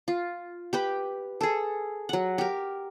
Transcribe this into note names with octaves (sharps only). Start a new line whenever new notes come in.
F4
G4 B4 G5
G#4 A4
F#3 F#5
G4 A#4